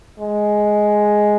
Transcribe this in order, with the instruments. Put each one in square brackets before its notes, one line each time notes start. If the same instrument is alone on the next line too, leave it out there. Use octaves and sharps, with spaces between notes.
[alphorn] G#3